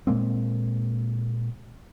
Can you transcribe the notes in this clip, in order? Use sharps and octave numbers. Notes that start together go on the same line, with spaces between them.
A#2 G#3 A#3 C4